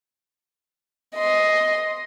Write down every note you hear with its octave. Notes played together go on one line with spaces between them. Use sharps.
D#5 C6